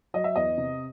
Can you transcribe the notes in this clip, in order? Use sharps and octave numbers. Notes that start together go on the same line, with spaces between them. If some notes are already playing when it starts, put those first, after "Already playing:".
F#3 D#5
E5
E2 D#5
C3